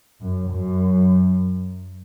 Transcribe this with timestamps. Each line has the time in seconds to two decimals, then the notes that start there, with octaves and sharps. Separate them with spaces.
0.22 F#2
0.52 F#2